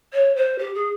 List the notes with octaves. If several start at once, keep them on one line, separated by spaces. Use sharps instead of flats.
C#5
C5
G4
G#4